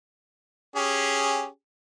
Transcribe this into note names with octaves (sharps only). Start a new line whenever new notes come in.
C#4 G4 G#4